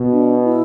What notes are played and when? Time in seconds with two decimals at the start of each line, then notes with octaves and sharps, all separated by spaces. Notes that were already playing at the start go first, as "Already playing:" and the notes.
Already playing: B2
0.12 D4
0.44 E4